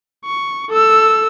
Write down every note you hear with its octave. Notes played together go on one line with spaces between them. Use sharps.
C#6
A4 E6